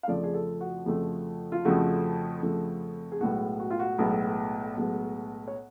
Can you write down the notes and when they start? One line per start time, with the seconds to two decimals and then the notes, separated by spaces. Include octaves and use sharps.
0.03 F5
0.08 F2 C#3 F3 A3 D5
0.24 G#4
0.34 A4
0.61 F#4
0.86 F2 C#3 F3 A3
1.52 F4
1.65 F2 C#3 F3 A3 F#4
2.42 F2 C#3 F3 A3
3.12 G#4
3.20 B1 A2 G#3 B3 F#4
3.60 F#4
3.70 F4
3.80 F#4
3.99 B1 A2 G#3 B3
4.77 B1 A2 G#3 B3
5.48 C#5